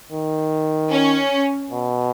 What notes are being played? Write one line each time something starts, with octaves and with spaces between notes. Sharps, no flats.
D#3
C#4
B2